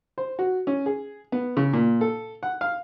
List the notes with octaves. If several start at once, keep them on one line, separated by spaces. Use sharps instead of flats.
C5
F#4
C#4
G#4
B3
C#3
A#2
A4
F#5
F5